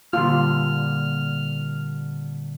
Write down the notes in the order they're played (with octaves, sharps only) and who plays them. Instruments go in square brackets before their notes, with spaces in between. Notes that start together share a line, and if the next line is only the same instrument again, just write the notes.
[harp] A#2 D3 G3 [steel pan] F4 [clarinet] F6